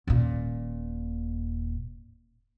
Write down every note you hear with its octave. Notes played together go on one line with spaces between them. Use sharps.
D#1 A#2